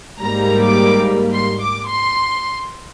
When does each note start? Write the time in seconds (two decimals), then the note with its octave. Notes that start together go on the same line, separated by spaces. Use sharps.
0.20 G#2 G3 A#3 A#5
0.63 D6
1.32 C6
1.61 D6
1.89 C6